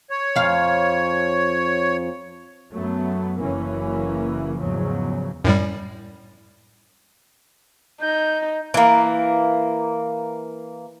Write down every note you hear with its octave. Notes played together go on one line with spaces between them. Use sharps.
C#5
F2 F5
F#2 F#3 A3 B3
F#1 F#2 C#3 E3 A#3 C#4
E2 G#2 C#3 F3 F#3
F#2 A2 G3
D#4 G6
E3 A#3